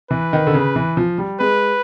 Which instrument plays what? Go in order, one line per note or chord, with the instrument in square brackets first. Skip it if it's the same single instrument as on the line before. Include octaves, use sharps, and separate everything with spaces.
[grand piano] E3 [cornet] B4
[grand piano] D#3
D3
C#3
E3
F3
G3
[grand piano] G#3 [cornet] B4